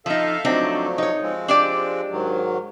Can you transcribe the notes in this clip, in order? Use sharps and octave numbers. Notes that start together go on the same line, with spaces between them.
F3 D#4 A4 E5 F5
F3 F#3 A3 C4 D4 D#4
D#4 C#5
F3 G#3 C4
D4 G4 D5
G#2 D#3 F#3